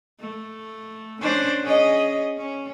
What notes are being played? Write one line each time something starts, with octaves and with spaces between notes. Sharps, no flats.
A3
C#4 D4 C5
C#4 G#4 D#5
C#4